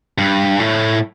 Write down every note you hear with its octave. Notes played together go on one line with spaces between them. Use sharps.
G2
A2